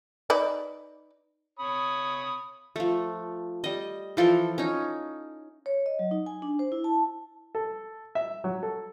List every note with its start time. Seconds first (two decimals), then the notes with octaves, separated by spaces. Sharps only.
0.30 D#4 B4 D5
1.59 C#5 B5 D#6
2.76 F3 A3
3.64 G3 D#5
4.17 E3 F3 A4 C6
4.58 C#4 D#4
5.66 C#5
5.86 D#5
5.99 F#3
6.11 D#4
6.26 G#5
6.42 D4
6.59 C5
6.72 E4
6.84 A5
7.55 A4
8.15 E5
8.44 F#3
8.63 A4